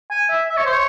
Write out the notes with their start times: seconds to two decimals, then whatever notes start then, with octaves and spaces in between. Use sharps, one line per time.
0.11 G#5
0.30 E5
0.49 E5
0.57 C#5
0.65 C5
0.73 C#5